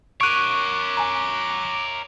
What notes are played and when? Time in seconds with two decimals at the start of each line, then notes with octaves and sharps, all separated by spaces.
0.21 A#4 C#5 C#6 D6 F#6 D7 D#7
0.97 G#5 A#5